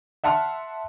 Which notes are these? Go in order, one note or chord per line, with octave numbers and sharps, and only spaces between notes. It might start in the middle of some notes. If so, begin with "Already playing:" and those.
E5 F#5 A5 C6 F6